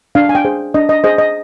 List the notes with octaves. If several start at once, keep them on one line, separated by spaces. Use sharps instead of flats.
D4 F5
G#5
G5
G#4 C5
D4 D#5
D#5
G#4 C5 D#5
D#5